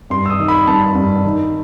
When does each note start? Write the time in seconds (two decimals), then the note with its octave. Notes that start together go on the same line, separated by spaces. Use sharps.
0.10 G2 C6
0.26 E6
0.30 D#6
0.39 D#3
0.48 B5
0.67 G2 A5
0.95 G2
1.25 D#3